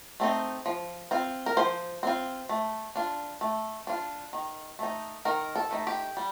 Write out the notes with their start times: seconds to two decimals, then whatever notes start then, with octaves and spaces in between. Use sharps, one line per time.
0.20 A3 C4 D#4
0.66 F3
1.11 C4 F4
1.46 A#4
1.57 F3 C5
2.03 C4 F4
2.49 A3
2.96 D4 F4
3.41 A3
3.87 D4 F4
4.33 D#3
4.79 A3 D#4
5.25 D#3 A#4
5.56 A4
5.71 A3 D#4
5.87 G4
6.17 G3